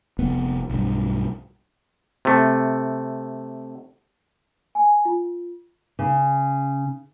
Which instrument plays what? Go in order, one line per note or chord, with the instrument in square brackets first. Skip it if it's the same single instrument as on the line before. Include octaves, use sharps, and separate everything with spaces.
[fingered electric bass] F1 B3
B1 G2
[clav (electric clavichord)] C3 A3
[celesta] G#5
F4
[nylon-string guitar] C#3